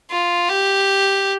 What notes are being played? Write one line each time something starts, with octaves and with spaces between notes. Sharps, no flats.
F4
G4